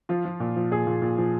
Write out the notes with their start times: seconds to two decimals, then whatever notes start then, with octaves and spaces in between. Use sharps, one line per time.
0.09 F3 F4
0.25 F3
0.40 A#2
0.56 F3
0.71 A#2 G#4
0.87 A#2
1.02 A#2
1.18 F3